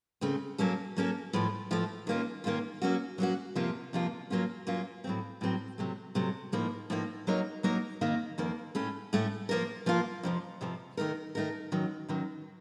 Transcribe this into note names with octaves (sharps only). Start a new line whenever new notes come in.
C#3 A3 C4
F#3 A#3 C#4 A4
F#3 A#3 C#4 A4
A2 F3 A3
A2 F3 A3
D#3 A#3 C#4 F4
D#3 A#3 C#4 F4
F#3 A#3 C#4 F#4
F#3 A#3 C#4 F#4
F2 C3 F3 A#3 F4
F2 C3 F3 A#3 F4
F#3 A#3 C#4 F4
F#3 A#3 C#4 F4
A2 F#3 C4
A2 F#3 C4
C3 F#3 A3
C3 F#3 A3
A2 F3 A#3 D#4
A2 F3 A#3 D#4
F#3 A#3 D#4 A#4 C#5
F#3 A#3 D#4 A#4 C#5
F2 D#3 A#3
F2 D#3 A#3
A2 A3 C#4
A2 A3 C#4
F3 A#3 F4 A#4
F3 A#3 F4 A#4
F2 C3 F3
F2 C3 F3
D#3 A3 D#4 A#4
D#3 A3 D#4 A#4
F#2 D#3 F#3
F#2 D#3 F#3